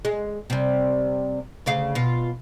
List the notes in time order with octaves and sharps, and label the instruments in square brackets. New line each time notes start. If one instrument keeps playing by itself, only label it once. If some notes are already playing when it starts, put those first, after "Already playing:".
[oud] G#3
C3 G3
D2 C#3 F5
B2 F4